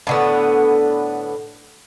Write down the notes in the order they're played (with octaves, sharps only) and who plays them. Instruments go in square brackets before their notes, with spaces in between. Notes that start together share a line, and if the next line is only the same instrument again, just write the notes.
[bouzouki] A2 D3 B3